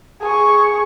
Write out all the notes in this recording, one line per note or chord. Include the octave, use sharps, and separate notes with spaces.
G#4 C#6